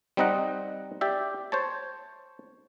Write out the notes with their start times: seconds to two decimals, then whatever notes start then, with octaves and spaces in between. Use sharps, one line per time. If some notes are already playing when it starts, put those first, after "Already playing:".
0.17 G3 C4 D#4 D#5 F#5
1.01 G4 D5 E5
1.52 C5 C#5 A5